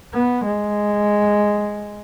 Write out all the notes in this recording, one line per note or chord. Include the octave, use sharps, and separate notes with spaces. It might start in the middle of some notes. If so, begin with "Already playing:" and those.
B3
G#3